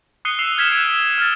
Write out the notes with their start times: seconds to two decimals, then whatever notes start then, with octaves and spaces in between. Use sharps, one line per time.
0.25 D#6 F#6 C7 C#7 D#7 G7
0.39 E6 C7 E7 F7
0.57 F6 G#6 B6 E7
0.72 F#6 D7 E7
1.18 F6 A6